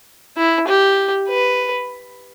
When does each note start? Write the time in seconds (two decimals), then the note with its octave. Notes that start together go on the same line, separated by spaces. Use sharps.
0.37 E4
0.67 G4
1.28 B4